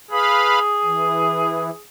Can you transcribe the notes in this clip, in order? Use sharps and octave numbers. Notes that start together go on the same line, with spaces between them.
G#4 B4 F5 B5
E3